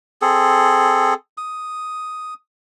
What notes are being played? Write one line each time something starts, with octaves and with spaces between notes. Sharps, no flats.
C4 G#4 A4
D#6